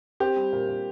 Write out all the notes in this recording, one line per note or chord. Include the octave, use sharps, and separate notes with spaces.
C4 G4
G3
A#2
A#2